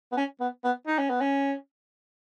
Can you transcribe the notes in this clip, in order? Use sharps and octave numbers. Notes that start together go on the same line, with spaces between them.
B3
C#4
B3
B3
D#4
C#4
B3
C#4